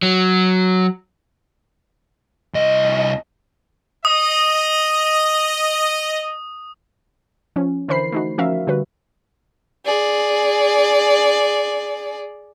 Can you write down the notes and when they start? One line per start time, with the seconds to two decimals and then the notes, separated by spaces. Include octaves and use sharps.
0.02 F#3
2.54 C2 D#5
4.05 D#5 D#6
7.56 F3 C#4
7.88 D3 E3 A#4 C5 B5 C7
8.12 A3 D#4 F#4
8.38 F3 C#4 F#4 A#4 E5 F5
8.67 D3 G3 F#4 B4
9.86 G#4 D5